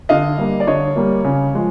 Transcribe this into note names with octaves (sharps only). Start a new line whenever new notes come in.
D3 D#5 F5
G3 A#3
D5
D3 C#5 D#5
G3 A#3
C#3
F3 G#3